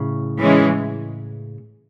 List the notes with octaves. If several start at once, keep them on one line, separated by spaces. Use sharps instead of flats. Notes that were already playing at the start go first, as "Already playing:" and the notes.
Already playing: A2 C#3
E3 G#3 C#4